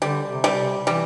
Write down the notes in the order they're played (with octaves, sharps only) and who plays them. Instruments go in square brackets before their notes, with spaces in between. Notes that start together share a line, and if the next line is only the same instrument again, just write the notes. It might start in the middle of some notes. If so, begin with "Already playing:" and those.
[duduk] D3 [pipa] G3
[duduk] C3
[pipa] G3
[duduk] C3
[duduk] E3 [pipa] G3